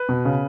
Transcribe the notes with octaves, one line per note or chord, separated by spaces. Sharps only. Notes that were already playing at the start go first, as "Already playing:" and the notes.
Already playing: B4
B2
C#3